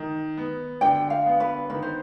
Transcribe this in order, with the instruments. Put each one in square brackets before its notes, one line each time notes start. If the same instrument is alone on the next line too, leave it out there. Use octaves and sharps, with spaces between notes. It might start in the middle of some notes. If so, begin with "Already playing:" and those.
Already playing: [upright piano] D#3
B3
[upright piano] D3 [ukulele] G5
[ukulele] F5
[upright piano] B3
[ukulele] B4
[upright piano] D#3 [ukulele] B4
[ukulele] C5